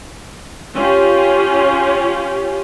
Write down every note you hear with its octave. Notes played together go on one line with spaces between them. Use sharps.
C#4 F4 G4